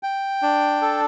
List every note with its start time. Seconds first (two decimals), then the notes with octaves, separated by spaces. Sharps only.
0.03 G5
0.43 D4
0.82 A4